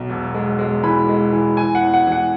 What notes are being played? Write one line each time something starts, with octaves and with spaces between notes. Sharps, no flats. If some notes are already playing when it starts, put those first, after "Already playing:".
Already playing: B1
E1
G#3
G#3
E3 B5
G#3
E3
E3 G#5
F#5
E2
F#5
E3
F#5